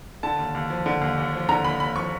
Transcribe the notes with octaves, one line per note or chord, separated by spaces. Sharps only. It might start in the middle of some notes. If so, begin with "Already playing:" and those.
D3 A5
D#2
D#2
F3
D3
D#2
D#2
F3
D3 A#5
D#2 B5
D#2 B5
F3 C#6